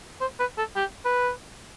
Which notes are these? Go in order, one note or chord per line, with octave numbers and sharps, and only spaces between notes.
C5
B4
A4
G4
B4